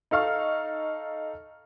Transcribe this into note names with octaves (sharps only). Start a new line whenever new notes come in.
D#4 A4 F5 C#6 F6